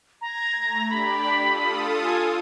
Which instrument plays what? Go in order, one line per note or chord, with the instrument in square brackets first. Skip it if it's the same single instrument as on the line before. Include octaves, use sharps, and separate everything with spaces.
[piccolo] A#5 [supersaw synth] G#6 A#6
[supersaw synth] A3
[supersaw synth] D4 G4 D5 [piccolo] B5
[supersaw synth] F4 A4 D#6
[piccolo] G#5